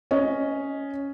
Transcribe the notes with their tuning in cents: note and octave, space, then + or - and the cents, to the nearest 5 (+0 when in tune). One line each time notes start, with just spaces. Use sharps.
C#4 +5 D#5 +0